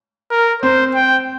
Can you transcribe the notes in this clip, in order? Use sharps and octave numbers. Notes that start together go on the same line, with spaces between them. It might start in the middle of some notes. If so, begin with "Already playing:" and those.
A#4
C4 C5
G5